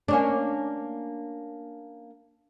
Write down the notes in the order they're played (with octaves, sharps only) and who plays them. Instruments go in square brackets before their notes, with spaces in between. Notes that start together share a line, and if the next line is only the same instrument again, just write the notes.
[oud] A#3 C#4 D4